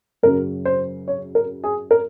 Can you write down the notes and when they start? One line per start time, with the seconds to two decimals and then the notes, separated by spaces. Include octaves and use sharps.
0.23 F#2 C#3 F#3 A#4
0.65 C5
1.08 C#5
1.35 A#4
1.64 G#4
1.91 A#4